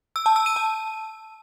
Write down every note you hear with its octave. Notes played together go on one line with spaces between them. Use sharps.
E6
A5
E6
D#7
A5